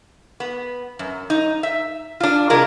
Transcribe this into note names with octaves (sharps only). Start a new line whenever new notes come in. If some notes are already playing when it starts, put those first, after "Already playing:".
B3
F#2
D#4
E5
D4 F4
C3 G#3 F4 A#4